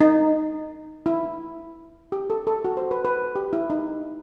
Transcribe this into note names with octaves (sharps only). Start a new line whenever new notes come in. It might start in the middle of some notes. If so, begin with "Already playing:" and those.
D#4
E4
G4
A4
A4
F#4
C5
B4
B4
G4
E4
D#4